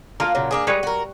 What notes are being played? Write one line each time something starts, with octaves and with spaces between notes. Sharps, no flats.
A#3 D4 F4 A#4
A#2 C#3 F#3
A#3 D4 G#4
G3 G#3 B4 C#5
F#4 A#4